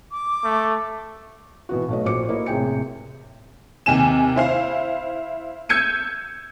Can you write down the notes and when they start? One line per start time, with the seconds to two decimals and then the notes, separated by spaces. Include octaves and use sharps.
0.11 D6
0.44 A3
1.69 B2 E3 B3 F#4
1.88 B1 A3 D#5
2.05 A#1 F#4 C5 D6 C#7
2.29 A#3 E4 D#5
2.46 A1 C3 G#4 G5 C#7
3.86 D#2 C3 G#5 E7
4.36 E4 C5 F5
5.69 E6 G6 G#6 C#7 D#7